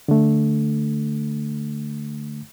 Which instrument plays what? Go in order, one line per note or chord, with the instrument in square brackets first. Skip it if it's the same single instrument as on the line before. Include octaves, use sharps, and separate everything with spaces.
[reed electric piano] D3 A3